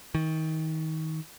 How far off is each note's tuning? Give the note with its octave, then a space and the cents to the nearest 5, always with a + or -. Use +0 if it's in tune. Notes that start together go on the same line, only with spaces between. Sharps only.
D#3 +30